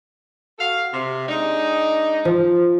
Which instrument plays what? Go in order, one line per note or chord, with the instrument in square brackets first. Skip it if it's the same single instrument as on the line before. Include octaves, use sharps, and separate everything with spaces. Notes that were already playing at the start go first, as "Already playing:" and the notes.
[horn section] F#4 A4 F5
C3
G#3 D4 D#4
[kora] F3